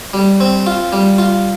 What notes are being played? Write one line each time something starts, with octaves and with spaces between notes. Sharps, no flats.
G3
C4
F4
G3
F4